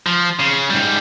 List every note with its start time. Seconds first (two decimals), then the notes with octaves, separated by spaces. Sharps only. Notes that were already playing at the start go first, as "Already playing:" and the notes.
0.07 F3
0.39 C#3
0.70 G#2 G3